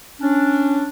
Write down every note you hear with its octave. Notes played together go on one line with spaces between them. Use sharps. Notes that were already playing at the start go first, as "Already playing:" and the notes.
C#4 D4